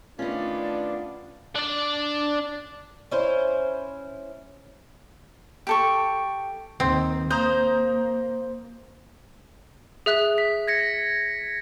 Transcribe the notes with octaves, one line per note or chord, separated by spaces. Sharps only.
D#3 A3 B3 C#4 D4 F4 D5
D4 D5
C#4 E4 C5
G4 A4 C#6
D#2 D#3 C4
A#3 C5 A#5 D#6 G6
G#4 E5 F#6
B6
G#6 A#6 C#7